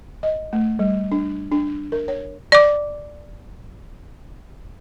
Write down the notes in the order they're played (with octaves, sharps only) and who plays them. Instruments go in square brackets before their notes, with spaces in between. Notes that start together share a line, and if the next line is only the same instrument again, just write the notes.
[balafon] D#5
A3
G3
D4
D4
A#4
C#5
D5 D6